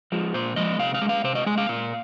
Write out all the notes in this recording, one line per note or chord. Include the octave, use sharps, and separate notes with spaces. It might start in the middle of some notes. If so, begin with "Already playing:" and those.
F3 G#3
A#2 C5
F3 G#3 D#5
C3 F5
F5
G#3
F5
C3 C5
D#5
G#3 G#5
F5
A#2